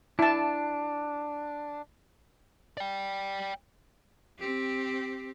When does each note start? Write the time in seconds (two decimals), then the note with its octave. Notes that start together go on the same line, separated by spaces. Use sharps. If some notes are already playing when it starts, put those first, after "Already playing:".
0.19 D4 E4 A5
2.77 D5 G5
4.39 C4 G4